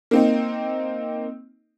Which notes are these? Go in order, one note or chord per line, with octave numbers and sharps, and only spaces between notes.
A#3 C4 D#4